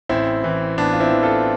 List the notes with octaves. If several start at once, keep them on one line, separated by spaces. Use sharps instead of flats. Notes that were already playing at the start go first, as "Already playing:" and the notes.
A1 C4 E4
E3
A1 B3 D4
F4
C4 E4
E3
F4 A4